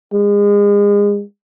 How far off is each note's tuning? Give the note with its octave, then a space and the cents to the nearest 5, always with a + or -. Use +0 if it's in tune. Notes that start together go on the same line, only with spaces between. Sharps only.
G#3 -30